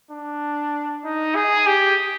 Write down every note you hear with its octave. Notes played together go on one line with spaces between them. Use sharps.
D4
D#4
G#4
G4